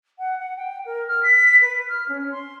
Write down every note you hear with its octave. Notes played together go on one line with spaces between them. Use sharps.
F#5
F#5
G5
A#4
F6
B6
B4
F6
C#4
C6